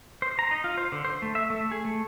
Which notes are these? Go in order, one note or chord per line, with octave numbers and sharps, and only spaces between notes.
C5
A#5
D#4
F4
C5
D3
C5
A3
E5
A3
G#4
A3